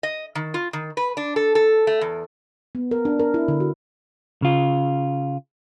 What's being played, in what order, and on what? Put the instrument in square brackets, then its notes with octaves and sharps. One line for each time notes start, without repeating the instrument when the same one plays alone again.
[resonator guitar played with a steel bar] D#5
D#3
F4
D#3
B4
D4
A4
A4
A3
E2
[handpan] B3
A#4
D4
A#4
E4
D3
F#4
[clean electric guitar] C#3 F4